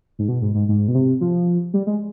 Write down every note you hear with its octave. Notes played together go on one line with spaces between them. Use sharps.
G#2
B2
G#2
G#2
G#2
B2
C3
F3
G3
G#3